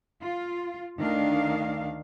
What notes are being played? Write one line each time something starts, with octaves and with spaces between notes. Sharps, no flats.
F4
D2 D#3 D4 F5